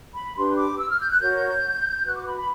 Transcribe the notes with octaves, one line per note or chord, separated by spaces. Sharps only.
B5
D4 G4 B4 C6
D6
E6
F6
G6
F#6
F#4 A#4 C#5 G6
F#4 B4 F#6
D6
B5
B5